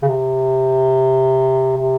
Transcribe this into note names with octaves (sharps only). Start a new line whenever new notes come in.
C#3
C3
C3